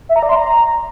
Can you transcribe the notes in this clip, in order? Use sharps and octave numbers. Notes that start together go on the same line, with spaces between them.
E5
A#5
D5
C6
A#5